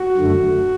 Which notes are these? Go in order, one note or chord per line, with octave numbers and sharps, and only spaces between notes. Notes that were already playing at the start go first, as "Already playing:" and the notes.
Already playing: F#4
F#2 D3 A3